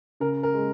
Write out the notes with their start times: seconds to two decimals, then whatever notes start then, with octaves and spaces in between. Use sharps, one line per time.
0.20 C#3 A#4
0.43 A#4
0.54 G#3